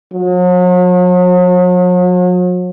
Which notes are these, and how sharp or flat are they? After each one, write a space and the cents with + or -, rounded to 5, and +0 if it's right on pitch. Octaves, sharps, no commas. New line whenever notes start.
F#3 -45